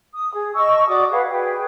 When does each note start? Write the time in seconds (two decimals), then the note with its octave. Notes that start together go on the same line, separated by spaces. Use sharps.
0.13 D#6
0.33 G#4
0.54 D#5 A5 C#6 E6
0.87 F#4 D5 D6 D#6
1.10 G#4 B4 F5 F#5
1.30 F#4 G#4 B4 G5